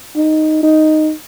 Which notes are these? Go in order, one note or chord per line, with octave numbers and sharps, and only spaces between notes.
D#4
D#4